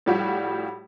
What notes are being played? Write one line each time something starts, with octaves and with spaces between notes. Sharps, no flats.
A2 F3 G3 F#4 G4